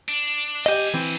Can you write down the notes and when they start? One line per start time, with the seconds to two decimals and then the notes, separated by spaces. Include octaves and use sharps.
0.09 D4
0.66 F2 G4 D#5 G#5
0.94 E3 C4